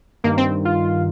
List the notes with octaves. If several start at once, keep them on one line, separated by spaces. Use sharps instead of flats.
G2 D#3 A#3
C4
F4